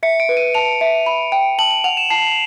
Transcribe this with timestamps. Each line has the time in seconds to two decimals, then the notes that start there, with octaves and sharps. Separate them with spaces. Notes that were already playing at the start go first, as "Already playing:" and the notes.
0.03 E5 C#7
0.20 D7
0.29 B4
0.37 D#7
0.54 A5 F7
0.81 E5
1.06 B5
1.32 G5
1.58 A5 F#7
1.71 F#7
1.84 F#5 F7
1.97 E7
2.10 A5 C7